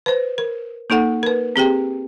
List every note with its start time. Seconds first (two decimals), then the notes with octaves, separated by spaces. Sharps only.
0.06 B4 C5
0.38 A#4
0.90 A#3 D#4 A4 F#5
1.23 A#4 B4
1.56 C4 G4 G#4 G5